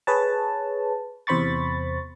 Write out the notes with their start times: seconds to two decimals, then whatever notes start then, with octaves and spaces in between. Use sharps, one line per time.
0.07 G#4 B4 C#5 A5
1.27 E2 C3 C5 B5 C#6 A6